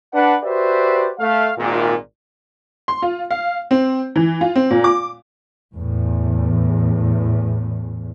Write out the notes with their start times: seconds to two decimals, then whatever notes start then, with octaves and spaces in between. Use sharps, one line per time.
0.13 D4 B4 F#5
0.43 F#4 G4 B4 C5 D5 E5
1.19 A3 F5
1.57 G#1 A#2
2.88 C6
3.02 F4
3.31 F5
3.71 C4
4.16 E3
4.41 F4
4.56 C4
4.70 A#2
4.84 D6
5.74 E2 A2